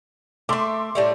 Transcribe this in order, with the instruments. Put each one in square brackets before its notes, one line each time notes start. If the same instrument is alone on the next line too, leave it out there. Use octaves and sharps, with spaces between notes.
[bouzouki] A3 E5 [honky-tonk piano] C6 D6
[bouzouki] A2 G3 A3